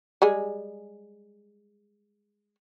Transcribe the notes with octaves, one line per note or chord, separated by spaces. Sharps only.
G3 G#3 G#4